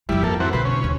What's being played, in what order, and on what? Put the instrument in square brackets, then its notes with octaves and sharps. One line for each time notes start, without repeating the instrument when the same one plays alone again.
[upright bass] F#2 F3 [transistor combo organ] G3 E4
[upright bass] F2 [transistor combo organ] A#3 A4
[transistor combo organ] E3 C4 F#4
[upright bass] B2 D3 [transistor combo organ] B4 C5
[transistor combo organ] C#4
[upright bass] D#2